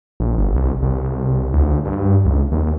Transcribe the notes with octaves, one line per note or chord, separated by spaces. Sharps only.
A#1
G1
C2
C2
D2
G2
C#2
D#2